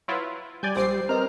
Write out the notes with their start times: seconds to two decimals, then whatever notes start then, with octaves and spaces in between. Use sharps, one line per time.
0.08 F#3 E4 F4 B4 C6
0.63 G3 D5 G#5 G6
0.76 A#1 G4 C5 D6 C7
1.09 C4 A#4 B4 D#5 A#5 F6